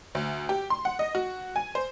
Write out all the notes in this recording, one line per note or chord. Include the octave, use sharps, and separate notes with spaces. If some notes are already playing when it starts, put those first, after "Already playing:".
D2
G4
C6
F#5
D#5
F#4
G#5
C5